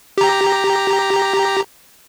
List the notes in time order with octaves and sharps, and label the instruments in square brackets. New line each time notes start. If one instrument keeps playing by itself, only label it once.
[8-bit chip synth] G4 A#5